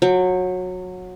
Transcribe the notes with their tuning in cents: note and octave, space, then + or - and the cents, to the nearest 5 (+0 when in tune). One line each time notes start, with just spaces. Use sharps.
F#3 -20 G5 +15